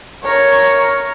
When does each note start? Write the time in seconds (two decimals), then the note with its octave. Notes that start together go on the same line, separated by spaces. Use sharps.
0.24 A#4 C#5